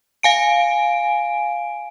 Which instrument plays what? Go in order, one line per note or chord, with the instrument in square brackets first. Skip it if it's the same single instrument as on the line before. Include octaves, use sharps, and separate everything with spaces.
[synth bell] F5 G#5 D7